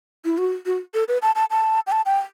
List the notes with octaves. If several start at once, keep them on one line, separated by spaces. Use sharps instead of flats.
E4
F#4
F#4
A4
B4
A5
A5
A5
G5
A5
G5